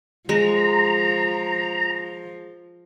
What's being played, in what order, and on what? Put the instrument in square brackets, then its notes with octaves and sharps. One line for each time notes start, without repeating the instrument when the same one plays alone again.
[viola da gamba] F3 [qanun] G#3 [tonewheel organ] A#5